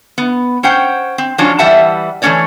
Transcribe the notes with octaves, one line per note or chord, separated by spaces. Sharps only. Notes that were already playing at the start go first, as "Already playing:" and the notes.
B3
C#4 C5 F#5 G5
C4
F3 F#3 C#4 D4 F4
E3 G3 E5 F#5 A5
E3 A3 C4 C#4 C#5 D5